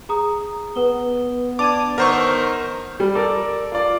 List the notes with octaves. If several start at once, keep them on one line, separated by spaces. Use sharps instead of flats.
G#4 A#5 D#6
B3 B4 D#6 G7
D4 D6 G#6 D#7 F7
D#3 A#4 C5 F#5 C#6 E6
G3
A4 A#4 D5
F4 D5